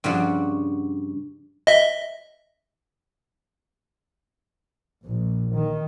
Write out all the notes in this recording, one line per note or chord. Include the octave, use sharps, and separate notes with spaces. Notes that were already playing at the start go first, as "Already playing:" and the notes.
G2 C#3 F3 G3 D4 F#4
D#5 E5
A#1
D#3